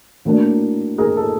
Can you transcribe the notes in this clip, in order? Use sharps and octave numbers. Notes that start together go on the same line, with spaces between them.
A2 F#3 A#3 D4
G#4 A#4
A4